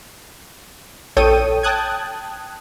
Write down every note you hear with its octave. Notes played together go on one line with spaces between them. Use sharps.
A#1 A4 C#5 G5 D#6 D#7
G5 A5 D#6 F#6 G#6